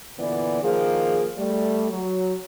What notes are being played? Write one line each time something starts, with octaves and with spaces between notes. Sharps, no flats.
A#2 D3 E3 B3 D5
D#3 F3 A#3 G#4
G3 A3
F#3